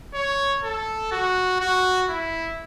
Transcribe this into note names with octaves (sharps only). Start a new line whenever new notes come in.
C#5
A4
F#4
F#4
E4